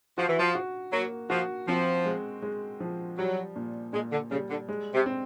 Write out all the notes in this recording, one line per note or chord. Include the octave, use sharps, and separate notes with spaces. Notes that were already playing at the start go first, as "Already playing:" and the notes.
F3 F#4
E3
F3
F#4
F#3 A#3
F3 F#4
F3 C4
G#3
G#3
F3
F#3 G3
A#2
A#2 G#3
D3
C#3 G3
D3
G#3
C3
C4